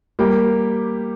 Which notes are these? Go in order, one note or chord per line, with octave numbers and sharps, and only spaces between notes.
G3 A#3 G4